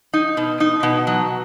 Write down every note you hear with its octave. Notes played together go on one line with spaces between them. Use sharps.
D#4
B2
D#4
B2
F#3